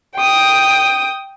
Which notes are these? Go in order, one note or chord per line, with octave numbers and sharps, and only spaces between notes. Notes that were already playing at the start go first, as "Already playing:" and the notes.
G5 D#6